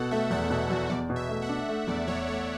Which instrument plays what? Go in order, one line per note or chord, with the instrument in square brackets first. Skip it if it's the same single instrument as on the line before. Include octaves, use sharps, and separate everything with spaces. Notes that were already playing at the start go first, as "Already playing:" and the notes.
Already playing: [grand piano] B2 [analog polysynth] A4 F#5
[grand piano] A3 [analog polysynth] E5
[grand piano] E2 [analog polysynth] F#5
[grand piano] B2 [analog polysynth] E5
[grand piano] E2 [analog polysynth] F#4
[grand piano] E2 [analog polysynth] D5
[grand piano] B2
[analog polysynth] E5
[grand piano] A3
[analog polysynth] F#5
[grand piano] D4
A3
[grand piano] E2 [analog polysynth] D5
[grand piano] E2 [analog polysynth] C#5
[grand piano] A3 [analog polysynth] C#5